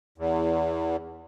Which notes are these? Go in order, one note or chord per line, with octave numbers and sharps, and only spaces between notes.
E2